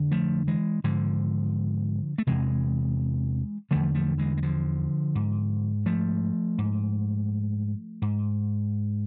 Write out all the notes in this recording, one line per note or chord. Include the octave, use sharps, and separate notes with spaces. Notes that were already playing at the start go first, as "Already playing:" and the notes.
Already playing: F2 D3
F3 A3
E3 G#3
G#2 D3 F3
A3
E2 C3 E3 G#3
E2 D3 F3 A3
F3 A3
E3 G#3
G#3
D3 F3
G#2
F3 A3
G#2
G#2